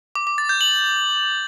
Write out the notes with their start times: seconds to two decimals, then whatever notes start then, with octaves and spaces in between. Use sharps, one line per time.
0.15 D6
0.27 D6
0.38 A6
0.49 G6
0.61 F#7